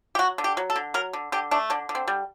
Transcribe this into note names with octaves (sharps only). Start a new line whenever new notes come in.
G4
F#3 F#4
D3
G4
F#3
A4
D3
F#3 A#4
D3
D3 G4
A3 D4
D3 D4
D3
C4
G3